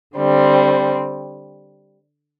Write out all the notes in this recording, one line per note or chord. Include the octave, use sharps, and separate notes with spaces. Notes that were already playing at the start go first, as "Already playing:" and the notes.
D3 G3 C4